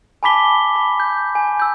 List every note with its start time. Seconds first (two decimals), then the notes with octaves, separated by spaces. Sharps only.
0.23 G#5 A5 B5 D6 B6 G7
0.76 B5
1.00 G6
1.35 G#5
1.60 E6 G6